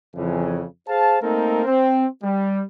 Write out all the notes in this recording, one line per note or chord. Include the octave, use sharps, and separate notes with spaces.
F2 C#3 E3
G#4 C5 F5 A5
A3 A#3 C4 D#4 A4 A#4
C4
G3